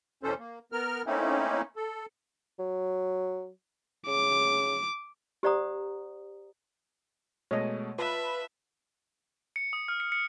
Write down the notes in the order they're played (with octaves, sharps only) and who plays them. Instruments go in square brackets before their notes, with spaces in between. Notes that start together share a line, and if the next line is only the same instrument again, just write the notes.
[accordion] E2 B2 E3 C#4 A4 C5
A#3
B3 A#4 F6
A3 A#3 C4 C#4 D#4 E4
A4
[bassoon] F#3
[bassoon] C#3 [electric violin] D6
[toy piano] G4 C5 D5 F#5 A#5 D#6
[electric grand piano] B2 G#3 A3 [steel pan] C#5 D#5
[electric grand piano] F4 A5 B5 [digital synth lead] B4 [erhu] E5
[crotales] C#7
D#6
F6
C#7
C#7